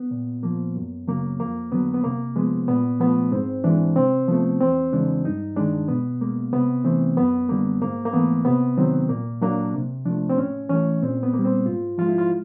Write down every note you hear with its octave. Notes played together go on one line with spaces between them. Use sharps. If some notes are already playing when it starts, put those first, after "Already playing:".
Already playing: B3
A#2
F3 A#3
F#2
C#3 F#3 A#3
F2 A#3
D3 F#3 B3
B3
C3 A#3
F3 G#3 B3
A#2 B3
F3 A3 B3
G#2 C4
E3 G#3 D4
C3 C4
F3 A3 B3
E2 C4
C#3 E3 G#3 D4
G2 D#4
D#3 G#3 D4
B2 B3
G#3 A#3
C3 B3
E3 A3 C4
F#2 B3
D3 G3 A#3
G#2 A#3
A#3
E3 A3 B3
C3 B3
D#3 F#3 C4
A#2 A#3
F#3 A#3 D4
C3
F3 A3 D4
C4
A2 C#4
E3 A3 C#4
A#2 C4
B3
A#3
G3
C4
G#2 F4
F3 G#3 F4
E4
F4